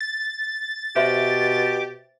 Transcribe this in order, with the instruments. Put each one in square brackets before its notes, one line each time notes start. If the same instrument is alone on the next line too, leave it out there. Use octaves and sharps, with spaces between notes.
[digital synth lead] A6
[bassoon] B2 [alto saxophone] G4 [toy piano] C5 E5 C6